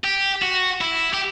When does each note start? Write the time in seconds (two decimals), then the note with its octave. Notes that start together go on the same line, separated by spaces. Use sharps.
0.04 G4
0.42 F#4
0.81 E4
1.14 G4